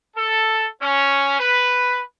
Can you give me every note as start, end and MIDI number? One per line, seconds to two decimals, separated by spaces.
0.16 0.66 69
0.82 1.39 61
1.39 2.00 71